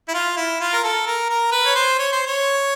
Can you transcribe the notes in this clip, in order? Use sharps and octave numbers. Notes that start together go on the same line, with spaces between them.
E4
F4
E4
F4
A#4
A4
A#4
A#4
B4
C#5
C5
C#5
C5
C#5